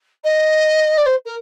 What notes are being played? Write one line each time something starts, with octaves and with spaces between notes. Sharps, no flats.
D#5
D5
C5
A#4